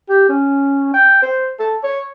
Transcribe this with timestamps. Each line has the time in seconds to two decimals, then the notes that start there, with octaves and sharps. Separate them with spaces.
0.09 G4
0.29 C#4
0.94 G5
1.22 C5
1.59 A4
1.84 C#5